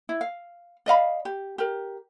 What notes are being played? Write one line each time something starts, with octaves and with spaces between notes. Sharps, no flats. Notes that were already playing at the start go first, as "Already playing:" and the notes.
E4
F5
D5 D#5 F5 B5
G4
G4 A#4